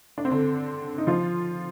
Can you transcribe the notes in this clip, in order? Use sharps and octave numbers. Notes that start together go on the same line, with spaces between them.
D4
C4
D3 D4
D#4
F3 F4